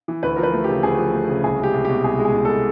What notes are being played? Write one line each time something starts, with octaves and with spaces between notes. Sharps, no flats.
E3
D2 B4
F3 A#4
B4
A3
C#3 G4
D2 G#4
F3
A3
C#3
C2 G#4
G#3 G4
C2
B2 G4
C2 G#4
G#3
G#4
C2
B2 A4